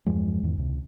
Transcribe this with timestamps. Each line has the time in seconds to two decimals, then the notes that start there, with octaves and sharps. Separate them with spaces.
0.06 E2 G2 F3 G#3
0.43 E2 G#2 D#3
0.57 C#2 C3